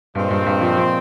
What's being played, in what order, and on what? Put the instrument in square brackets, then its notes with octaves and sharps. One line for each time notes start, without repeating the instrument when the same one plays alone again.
[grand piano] G2 [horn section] A#2 G#3 C4
[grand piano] G2
G2
F3
F3